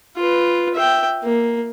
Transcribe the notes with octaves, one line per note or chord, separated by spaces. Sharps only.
F4 B4
E5 G5
A#3